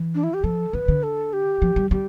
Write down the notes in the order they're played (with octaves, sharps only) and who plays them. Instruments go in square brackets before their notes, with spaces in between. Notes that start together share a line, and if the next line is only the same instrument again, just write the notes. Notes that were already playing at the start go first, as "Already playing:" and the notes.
Already playing: [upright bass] E3
[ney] D4
E4
G4
[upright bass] F3 [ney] A4
[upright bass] E3 [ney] B4
[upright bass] D3
[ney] A4
G4
[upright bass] F3
G3
[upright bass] G3 [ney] G4